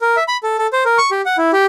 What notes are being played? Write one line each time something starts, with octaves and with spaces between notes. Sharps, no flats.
A#4
E5
B5
A4
A4
C5
A#4
C#6
G4
F#5
E4
G4